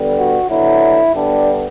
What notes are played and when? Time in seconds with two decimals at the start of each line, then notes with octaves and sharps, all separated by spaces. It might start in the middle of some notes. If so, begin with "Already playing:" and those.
Already playing: D3 G3 B3
0.17 F#4
0.49 D3 F#3 B3 E4
1.15 D3 G3 B3 D4